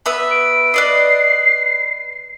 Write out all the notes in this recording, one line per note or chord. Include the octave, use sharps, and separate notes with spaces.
B3 B4 E5
D7
B4 D5 D#5 C7